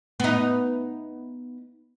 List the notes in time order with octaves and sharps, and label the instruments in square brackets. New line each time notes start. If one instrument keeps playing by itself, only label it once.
[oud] B3 D#4